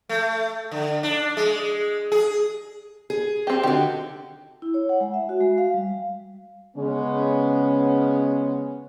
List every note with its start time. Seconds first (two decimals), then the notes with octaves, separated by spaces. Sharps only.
0.09 A3
0.71 D3
1.03 D4
1.37 G#3
2.12 G#4
3.10 G#4
3.47 C4 G4
3.63 D3 D#3 F#4 G4
4.62 E4
4.74 C#5
4.89 F#5
5.01 G#3
5.14 E5
5.29 F#4
5.41 G#3
5.58 F5
5.74 G3
6.76 C#3 G#3 B3 C#4